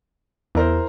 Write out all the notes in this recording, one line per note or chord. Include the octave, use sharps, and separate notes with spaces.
E2 E4 A#4 C5